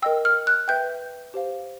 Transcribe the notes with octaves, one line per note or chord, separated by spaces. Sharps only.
A#4 D#5 G5 E6
F6
F#6
B4 E5 G5 G6
G4 C5 F5